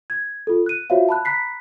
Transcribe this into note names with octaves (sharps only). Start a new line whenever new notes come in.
G#6
F4 A4
F#6 D#7
F4 F#4 C5 C#5 E5 F5
A5 B5 F#6
A#5 B5 F#6 B6 C7